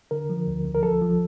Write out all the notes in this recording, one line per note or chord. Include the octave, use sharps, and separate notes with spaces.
D3 A#4
F3
D2
D2
A#4
F3 A4
F3